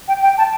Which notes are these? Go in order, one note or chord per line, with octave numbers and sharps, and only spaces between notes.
G5
G5
A5